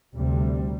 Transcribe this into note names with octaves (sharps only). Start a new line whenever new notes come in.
D2 C3 G3